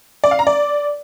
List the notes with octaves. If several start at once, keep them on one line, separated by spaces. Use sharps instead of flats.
D5
F5
A#5
D5